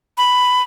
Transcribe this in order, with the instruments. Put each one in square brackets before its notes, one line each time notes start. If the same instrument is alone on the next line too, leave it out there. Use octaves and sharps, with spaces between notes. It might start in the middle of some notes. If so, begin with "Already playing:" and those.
[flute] B5